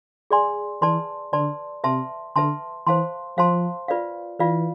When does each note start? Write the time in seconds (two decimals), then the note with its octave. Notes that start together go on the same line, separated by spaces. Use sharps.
0.31 G#4 D5 G#5 C6
0.82 E3 B4 D5 A5 C6
1.33 D3 B4 D5 A5 C6
1.84 C3 B4 E5 A5 C6
2.36 D3 B4 E5 A5 C6
2.86 E3 C5 F5 A5 C6
3.38 F3 C5 F5 A5 C6
3.88 F4 B4 D5 F5
4.39 E3 F4 B4 D5 F5